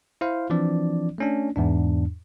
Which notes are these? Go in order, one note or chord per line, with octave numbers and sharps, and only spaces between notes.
E4 C5 F5
E3 F3 C4 D4 D5
A3 C#4 D4
E2 G#2 D4